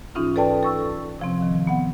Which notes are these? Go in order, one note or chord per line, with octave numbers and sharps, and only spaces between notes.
G#2 E3 C#4 D#4 F4
A4 B4 D5 G5 A5
A4 C#6 E6
C3 F3 C4
D#3
B3 F#5